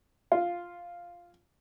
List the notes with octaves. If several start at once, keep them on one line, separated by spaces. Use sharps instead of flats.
F4